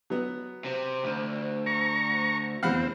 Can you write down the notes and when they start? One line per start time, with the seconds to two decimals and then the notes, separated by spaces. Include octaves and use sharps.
0.10 F#3 B3
0.65 C3
1.04 D2
1.66 A#5 C#6
2.63 F1 E2 C4 F5 F#5 B5